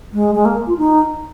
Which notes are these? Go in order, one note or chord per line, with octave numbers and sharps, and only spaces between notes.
G#3
G#3
A#3
F4
D#4